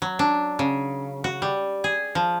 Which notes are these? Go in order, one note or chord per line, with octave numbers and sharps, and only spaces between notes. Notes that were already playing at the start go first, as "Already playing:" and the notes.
F#3
D4
C#3
F#4
G3
G#4
F3